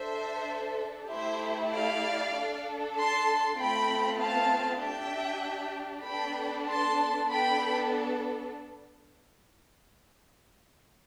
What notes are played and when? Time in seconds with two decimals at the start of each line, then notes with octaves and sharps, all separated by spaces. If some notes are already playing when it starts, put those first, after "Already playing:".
Already playing: D4 A4 C5 E5
1.11 A3 E4 G4 C5 E5
1.73 D5 F5
2.35 D4 A4
2.96 A5 C6
3.58 A3 C4 F4 G5 B5
4.20 F5 A5
4.82 D4 G4 E5 G5
6.05 B3 D4 A4 G5 B5
6.68 A5 C6
7.29 B3 D4 A4 G5 B5